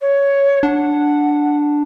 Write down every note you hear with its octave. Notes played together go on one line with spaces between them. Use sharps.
C#5
D4 F#5